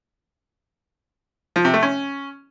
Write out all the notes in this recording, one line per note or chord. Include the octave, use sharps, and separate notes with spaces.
F3
C3
A3
C#4